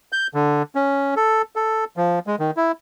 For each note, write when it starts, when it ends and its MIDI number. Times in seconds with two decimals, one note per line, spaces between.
0.12 0.27 91
0.34 0.62 50
0.75 1.14 61
1.16 1.42 69
1.56 1.84 69
1.97 2.19 53
2.27 2.36 56
2.39 2.51 51
2.57 2.72 64